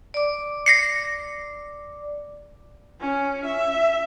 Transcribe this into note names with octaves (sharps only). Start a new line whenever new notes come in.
D5 D6
A#6 C7 C#7
C#4
E5